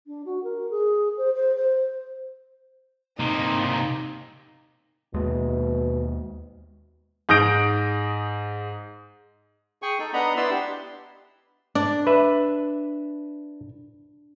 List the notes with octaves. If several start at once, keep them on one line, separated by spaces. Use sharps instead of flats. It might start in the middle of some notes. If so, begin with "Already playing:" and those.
D4
F#4
A#4
G#4
C5
C5
C5
C3 A#3 D#4
D#2 B2 G#3
G#2 D#6 G6 A#6 D7
G#4 G5 G#5 C#6
D#4 A4
B3 D4 D#5 F#5 A#5 B5
B3 E4 B4 D5 C6 E6
D4 G4
D4 D5
B4 E5